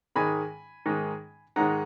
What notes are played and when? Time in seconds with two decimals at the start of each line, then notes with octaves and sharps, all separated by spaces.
0.16 G#2 D#3 G#3 D#4 G#5 B5
0.86 G#2 D#3 G#3 D#4
1.56 G#2 D#3 G#3 D#4 F#5 A#5